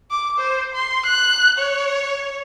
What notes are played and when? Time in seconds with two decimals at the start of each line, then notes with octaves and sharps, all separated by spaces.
0.11 D6
0.39 C5
0.74 C6
1.05 F#6
1.58 C#5